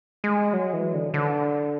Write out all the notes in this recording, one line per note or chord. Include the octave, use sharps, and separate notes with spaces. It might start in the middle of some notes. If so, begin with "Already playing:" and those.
G#3
F#3
E3
D3
D3